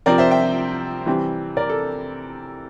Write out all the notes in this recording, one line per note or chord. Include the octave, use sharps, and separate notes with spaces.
C3 F3 C4 A#4 D5
C5 E5
E5 G5
C3 E3 G3 C4
A#4 D5
A4